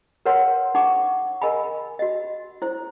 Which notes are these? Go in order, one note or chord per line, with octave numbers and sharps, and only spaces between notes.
A#4 B4 C#5 F#5 C6
D#4 F#5 C#6 D6
A#4 D#5 G#5 B5
F#4 D#5
E4 C5